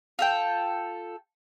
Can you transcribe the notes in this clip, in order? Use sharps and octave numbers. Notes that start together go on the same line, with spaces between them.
F4 A4 G5